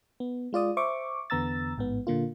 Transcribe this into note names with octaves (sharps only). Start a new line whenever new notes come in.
B3
G#3 F4 D5 D#6
C5 E5 C#6 D6
E2 D3 B3 A#5 E6 A6
A1 G#2 B3
A#2 D3 A#3 F4